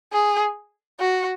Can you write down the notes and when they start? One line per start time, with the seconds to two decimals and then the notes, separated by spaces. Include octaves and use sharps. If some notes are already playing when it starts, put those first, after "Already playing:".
0.13 G#4
1.00 F#4